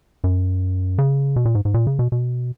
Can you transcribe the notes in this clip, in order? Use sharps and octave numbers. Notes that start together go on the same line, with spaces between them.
F#2
C#3
B2
A#2
G#2
G#2
A#2
C#3
B2
B2